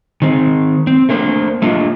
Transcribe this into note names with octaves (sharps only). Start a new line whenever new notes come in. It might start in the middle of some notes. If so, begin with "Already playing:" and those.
D#3 C4
C4
A3 A#3 D4 C5
A3 A#3 D4 F4 D#5